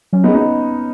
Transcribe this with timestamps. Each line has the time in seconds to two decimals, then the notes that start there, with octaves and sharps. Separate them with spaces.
0.13 F#3 C#4
0.24 B3 D#4
0.28 G#4
0.35 B3 D#4